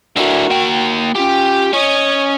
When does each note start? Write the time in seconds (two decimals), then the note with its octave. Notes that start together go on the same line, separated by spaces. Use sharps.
0.17 D3 E4 F#4 A#4
0.51 A#3 G5
1.15 C#4 F4 G4
1.73 C#4 C#5 D#5